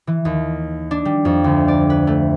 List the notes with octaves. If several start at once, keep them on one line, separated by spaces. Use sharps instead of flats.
E3
D#2
D4
G3
F2
D2
D5
B4
A3